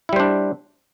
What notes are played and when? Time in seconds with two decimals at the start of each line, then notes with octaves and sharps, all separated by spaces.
0.09 E4
0.13 G3
0.16 C5
0.20 D4